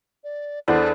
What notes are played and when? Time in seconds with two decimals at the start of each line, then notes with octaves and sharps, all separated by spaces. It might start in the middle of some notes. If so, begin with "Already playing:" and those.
0.24 D5
0.68 E2 D4 A4 C5 F#5